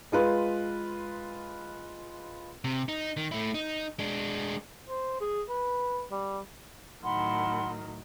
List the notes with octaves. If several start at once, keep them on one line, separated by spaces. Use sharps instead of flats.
G#3 F4 B4
C3
D#4
D#3
A3 E4
D#4
G#3 D4
C5
G#4
B4
G3
A2 D#3 F#3 F#5 B5 C6